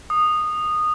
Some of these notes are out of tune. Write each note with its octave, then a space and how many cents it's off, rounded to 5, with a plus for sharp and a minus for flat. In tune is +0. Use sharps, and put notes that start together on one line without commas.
D#6 -15